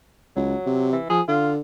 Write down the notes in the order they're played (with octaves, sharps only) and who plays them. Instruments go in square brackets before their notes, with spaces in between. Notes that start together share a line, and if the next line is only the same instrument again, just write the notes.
[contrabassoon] C#2 [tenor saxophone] F#3
[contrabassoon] C3
[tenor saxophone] E3
[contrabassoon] F3 [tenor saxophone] G#4
[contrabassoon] D3 [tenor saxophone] F4